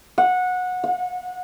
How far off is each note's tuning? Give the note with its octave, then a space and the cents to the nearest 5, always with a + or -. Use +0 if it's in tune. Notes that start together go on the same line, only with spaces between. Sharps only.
F#5 -20
F#5 -40